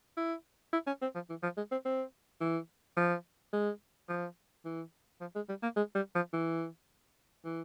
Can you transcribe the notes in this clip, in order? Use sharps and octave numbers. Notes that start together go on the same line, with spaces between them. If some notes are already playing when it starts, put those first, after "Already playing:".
E4
E4
C#4
C4
F3
E3
F3
G#3
C4
C4
E3
F3
G#3
F3
E3
F3
G#3
G3
A#3
G#3
G3
F3
E3
E3